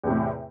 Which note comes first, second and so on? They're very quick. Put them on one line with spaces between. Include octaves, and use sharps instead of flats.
E2 C3 A2